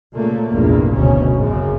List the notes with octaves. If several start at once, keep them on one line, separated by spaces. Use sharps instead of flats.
A#2 C#3 A3 A#3
A#1 E2 G2 C3 A#3
F#1 D2 B2 D#3 C#4
G#1 F#2 C#3 G#3